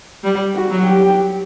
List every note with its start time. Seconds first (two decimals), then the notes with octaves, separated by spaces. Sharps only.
0.24 G3
0.55 F#4
0.70 F#3
0.86 G4